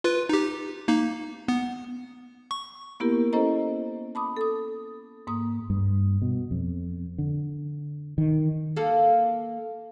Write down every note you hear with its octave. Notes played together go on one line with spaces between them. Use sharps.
F4 B4
D#4 G4
A#3 D#4
B3
C#6
A#3 B3 E4 G4 A#4
C#4 E4 A4 C5 D#5 A#5
A5 B5 D6 D#6
A4 D#6
G#2 A#3 D#6
G2
B2
F2
D3
D#3
A#3 A4